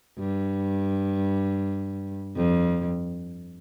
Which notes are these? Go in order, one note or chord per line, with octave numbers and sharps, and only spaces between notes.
G2
F2